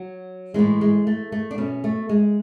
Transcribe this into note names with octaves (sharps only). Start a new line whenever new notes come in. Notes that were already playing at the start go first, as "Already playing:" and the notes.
Already playing: F#3
A2 E3 G#3
G#3
A3
A3
D4
B2 C#4
A3
G#3